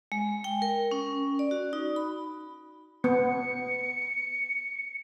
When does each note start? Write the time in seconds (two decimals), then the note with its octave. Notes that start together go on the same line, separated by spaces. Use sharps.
0.12 G#3
0.44 G5
0.62 A#4
0.91 C#4
1.39 D5
1.51 F#4
1.73 D#4
1.96 B5
3.04 B3 C#7